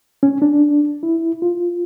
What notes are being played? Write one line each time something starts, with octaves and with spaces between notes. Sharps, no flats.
C#4
D4
E4
F4